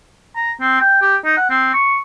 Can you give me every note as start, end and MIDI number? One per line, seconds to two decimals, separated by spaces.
0.36 0.51 82
0.61 0.79 60
0.81 1.00 79
1.02 1.16 67
1.25 1.37 63
1.37 1.49 78
1.50 1.71 60
1.74 1.98 85